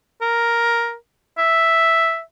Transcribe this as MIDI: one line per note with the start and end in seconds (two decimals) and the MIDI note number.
0.21 0.95 70
1.38 2.21 76